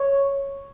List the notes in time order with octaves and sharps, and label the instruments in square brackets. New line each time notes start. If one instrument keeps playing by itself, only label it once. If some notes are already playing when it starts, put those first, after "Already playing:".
Already playing: [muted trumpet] C#5